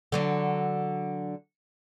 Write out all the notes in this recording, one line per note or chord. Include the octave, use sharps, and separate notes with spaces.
D3 F#3 D4